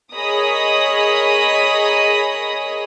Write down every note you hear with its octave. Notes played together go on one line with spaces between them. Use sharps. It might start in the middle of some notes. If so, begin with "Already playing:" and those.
G#4 A#4 C#5 D#5 B5 D#6